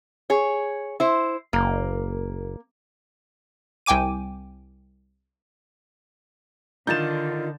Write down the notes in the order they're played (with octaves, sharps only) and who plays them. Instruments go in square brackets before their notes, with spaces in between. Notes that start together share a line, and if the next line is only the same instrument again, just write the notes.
[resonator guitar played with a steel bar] G#4 C#5
E4 C5
[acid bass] F#1 [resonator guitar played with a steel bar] A#3
[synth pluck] C2 G5 G#5 D6 D#7
[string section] D3 [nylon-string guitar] D#3 D#4 [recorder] F4 [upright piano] G6 A6 E7